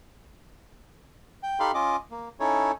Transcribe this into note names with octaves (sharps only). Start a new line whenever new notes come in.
G5
D#4 G4 A4 F5 B5 C6
C#4 F4 D#5 D6
A#3
C#4 D#4 E4 A4 C#5